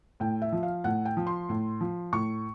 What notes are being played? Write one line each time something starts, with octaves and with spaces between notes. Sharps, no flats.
A2 G5
E5
F3
F5
A2 F#5
G5
F3
C6
A2
F3
A2 C#6